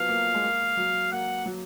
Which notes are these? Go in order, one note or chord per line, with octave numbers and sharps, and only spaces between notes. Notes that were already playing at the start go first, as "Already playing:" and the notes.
Already playing: F3 F#3 B3 F5
A#3
G#3
A#3
F#3
A#3 F#5
F#3